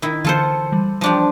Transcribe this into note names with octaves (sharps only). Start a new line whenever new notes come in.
D#3 E4
D3 E3 F4 A4 C5 C#7
E3 G3
F3 D4 G4